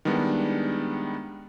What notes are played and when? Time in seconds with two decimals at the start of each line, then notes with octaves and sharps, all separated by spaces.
0.05 D#3 G3 G#3 B3 D4 E4